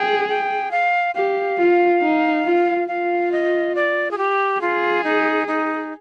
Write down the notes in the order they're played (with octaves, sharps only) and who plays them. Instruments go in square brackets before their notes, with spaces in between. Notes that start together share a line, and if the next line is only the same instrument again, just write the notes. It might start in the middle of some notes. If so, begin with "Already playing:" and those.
Already playing: [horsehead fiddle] G#4 [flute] G5
[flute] G5
F5
[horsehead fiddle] G4 [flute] F5
[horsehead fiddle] F4
D#4
F4
[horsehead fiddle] F4 [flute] F5
[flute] D#5
D5
G#4
G4
[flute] F4 [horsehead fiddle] G#4
[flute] D#4
D#4